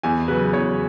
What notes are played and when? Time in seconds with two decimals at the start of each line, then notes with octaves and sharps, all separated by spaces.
0.03 E2 G#5
0.28 C#3 F#3 B4
0.53 E2 C#5